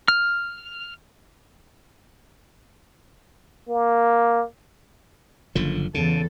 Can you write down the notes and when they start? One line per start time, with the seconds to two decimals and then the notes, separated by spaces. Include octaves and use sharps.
0.08 F6
3.68 A#3
5.55 F#1 D3 F3
5.94 E2 C#3 A4